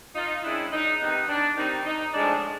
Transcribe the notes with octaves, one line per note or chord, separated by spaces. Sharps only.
D#4 F4
D#3 G#3 C#4 D4 E4
D#4
C3 D#3 G3 B3 D#4
D4
D#3 G3 C4 D#4
D#4
A2 F3 G#3 D4